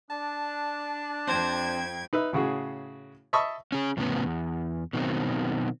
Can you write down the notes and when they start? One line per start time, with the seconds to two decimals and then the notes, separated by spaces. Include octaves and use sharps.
0.10 D4 A5
1.27 F2 C4 C5 G5 G#6
2.13 D#4 B4 E5
2.33 A2 C#3 F#4 G#4
3.33 D#5 E5 A5 B5 C#6 D#6
3.72 C#4 G#4
3.97 F2 A2 C#3 A3 B3 C#4
4.26 E2
4.93 B2 D#3 F#3 C4